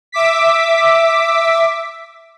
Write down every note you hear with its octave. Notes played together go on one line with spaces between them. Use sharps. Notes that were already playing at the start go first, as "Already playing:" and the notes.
E5 D6 B6